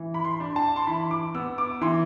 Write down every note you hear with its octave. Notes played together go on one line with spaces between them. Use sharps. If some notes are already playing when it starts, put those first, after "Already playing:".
Already playing: E3
B5
C6
D4
A5
C6
E3 B5
D6
B3 E6
D6
E3 C6